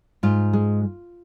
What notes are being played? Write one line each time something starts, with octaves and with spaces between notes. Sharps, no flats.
G#2 F4
G#3